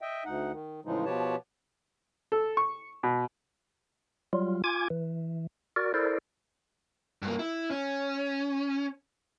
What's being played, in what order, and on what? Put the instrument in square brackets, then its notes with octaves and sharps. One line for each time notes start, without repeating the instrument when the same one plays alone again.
[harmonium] D#5 E5 G5
D2 D#4 F#5
D#3
A2 C#3 E3 F3 G#3 D#4
B2 F3 G4 B4 C#5 A5
[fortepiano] A4
C#6
B2
[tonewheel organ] F#3 G3 F4
F4 G#5 D6 G#6
E3
F#4 A#4 D5
E4 A4 A#4 C5 D5
[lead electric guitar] G2 A#3
E4
C#4